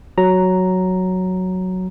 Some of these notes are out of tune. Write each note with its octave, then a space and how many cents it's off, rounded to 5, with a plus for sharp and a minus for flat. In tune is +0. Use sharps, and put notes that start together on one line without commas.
F#3 +0 A#5 +0